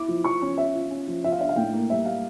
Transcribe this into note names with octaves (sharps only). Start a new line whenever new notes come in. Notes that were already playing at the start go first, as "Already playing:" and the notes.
Already playing: E4 D6
F3
F3 C#6
C#4
C#4 E5
F4
C#4
F3
F4 E5
F5
D4 E5
F5
A2 G5
A#3
G3 E5
G3 F5